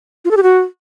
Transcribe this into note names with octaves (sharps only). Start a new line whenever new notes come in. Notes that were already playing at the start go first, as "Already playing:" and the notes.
F4
A4
G4
F#4